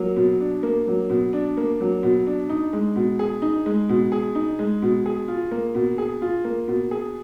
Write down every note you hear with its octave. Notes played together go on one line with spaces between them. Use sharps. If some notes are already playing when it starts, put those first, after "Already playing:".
Already playing: F#3 A#3
B2
D4
A#3
F#3
B2
D4
A#3
F#3
B2
D4
D#4
G#3
B2
G#4
D#4
G#3
B2
G#4
D#4
G#3
B2
G#4
F4
A#3
B2
G#4
F4
A#3
B2
G#4